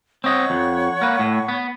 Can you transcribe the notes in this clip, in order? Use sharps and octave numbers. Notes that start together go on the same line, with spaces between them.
C4 C#5 D#5 F#5 C#6
F2
A#3 B4
A2
B3